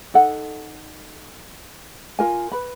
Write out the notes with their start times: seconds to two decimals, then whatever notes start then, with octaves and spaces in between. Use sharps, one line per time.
0.14 D#4 A4 F#5
2.19 F4 A#4 G#5
2.52 B4 B5